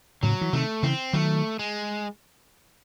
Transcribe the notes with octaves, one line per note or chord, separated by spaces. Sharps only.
A2 C#3 F#3
E3
C3 D#3 A3
C#3 E3 C4
D#3 F#3 A3
G#3